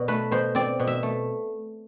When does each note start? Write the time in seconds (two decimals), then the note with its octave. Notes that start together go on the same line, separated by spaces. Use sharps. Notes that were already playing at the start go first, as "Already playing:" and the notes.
Already playing: B2 D5
0.08 A3 B4
0.31 B2 C5
0.55 C4 D5
0.79 B2
0.87 E5
1.03 A3